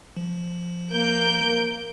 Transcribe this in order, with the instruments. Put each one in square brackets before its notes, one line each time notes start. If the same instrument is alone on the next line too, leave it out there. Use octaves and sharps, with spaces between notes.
[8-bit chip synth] F3
[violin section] A#3 G6 D7